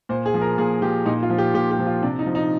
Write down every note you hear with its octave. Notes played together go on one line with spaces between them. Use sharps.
A#2 C5
G#4
F3
A#4
A#2 G#4
F3 G4
A#2 D#4
F4
F3
G4
A#2 G4
G4
F3
F4
C3 D4
D#4
F3
D#4